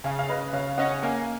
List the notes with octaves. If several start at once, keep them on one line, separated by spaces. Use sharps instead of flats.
C#3 F5 G#5
F5
C#3 B4 D#5
C#3 C#5 F5
C#4 D#5 F#5
A#3 F5 G#5